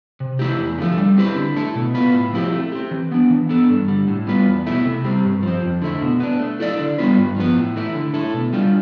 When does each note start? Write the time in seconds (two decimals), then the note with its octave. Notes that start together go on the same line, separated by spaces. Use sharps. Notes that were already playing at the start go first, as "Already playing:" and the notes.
0.20 C3
0.39 E3 A3 E4 G4
0.60 E2
0.78 D3 F3 A3
0.98 G3
1.17 C4 E4 G4 B4
1.36 D3
1.56 A3 E4 A4
1.75 B2
1.94 B3 F4 B4
2.14 A2
2.33 F3 C4 E4 G4
2.53 A3
2.72 C4 G4
2.91 E3
3.11 B3 D4
3.30 E3
3.49 B3 D4 A4
3.70 G2
3.88 D3 G3
4.08 A2
4.27 G3 B3 F4 B4
4.46 E2
4.67 B2 A3 E4
4.85 C3
5.04 G3 C4
5.24 G2
5.43 F3 C4
5.62 F2
5.82 D3 A3 E4
6.02 B2
6.20 B3 D4
6.39 A3
6.60 E4 A4 D5
6.79 D3
6.98 G3 B3 F4 B4
7.18 G2
7.36 F3 B3
7.56 A2
7.76 E3 A3 E4
7.95 D3
8.14 A3 E4 A4
8.34 B2
8.53 G3 D4 F4